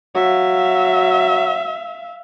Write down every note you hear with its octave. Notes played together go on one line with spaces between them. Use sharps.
F#3 E5 F5